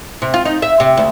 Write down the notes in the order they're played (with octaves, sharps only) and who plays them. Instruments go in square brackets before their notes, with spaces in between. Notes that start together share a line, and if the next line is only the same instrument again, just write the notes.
[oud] C3
F4
D#4
E5
C3
D2